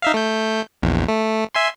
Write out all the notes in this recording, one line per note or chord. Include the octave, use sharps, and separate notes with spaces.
D#4 E5 F5
A3 G6
A#1 E2
A3
E5 G#5 C6